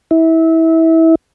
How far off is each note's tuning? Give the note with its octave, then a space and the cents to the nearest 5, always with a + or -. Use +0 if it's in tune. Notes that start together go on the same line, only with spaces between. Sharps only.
E4 -25